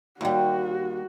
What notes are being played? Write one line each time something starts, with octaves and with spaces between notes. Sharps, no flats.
D#2 G3 F#4